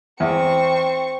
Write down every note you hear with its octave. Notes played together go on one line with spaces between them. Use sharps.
E2 C4 C#6